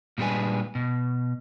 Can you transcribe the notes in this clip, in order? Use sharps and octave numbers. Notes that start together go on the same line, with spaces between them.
A#2 G3 G#3 D4 B4 G#5
B2